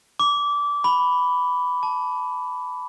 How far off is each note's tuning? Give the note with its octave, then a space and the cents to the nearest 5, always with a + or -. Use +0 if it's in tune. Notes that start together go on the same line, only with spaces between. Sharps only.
D6 -20
B5 +5
A5 -15